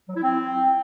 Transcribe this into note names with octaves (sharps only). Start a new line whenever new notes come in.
F#3
E4
C4